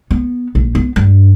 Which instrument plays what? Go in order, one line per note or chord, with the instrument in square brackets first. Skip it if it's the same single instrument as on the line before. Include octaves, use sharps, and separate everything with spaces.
[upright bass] B3
A#1
B3
G2